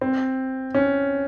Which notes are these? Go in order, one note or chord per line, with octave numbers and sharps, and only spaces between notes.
C4
C#4